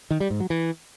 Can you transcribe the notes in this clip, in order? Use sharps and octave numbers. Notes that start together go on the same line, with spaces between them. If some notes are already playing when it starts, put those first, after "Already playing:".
D#3
G3
G#2
F#3
E3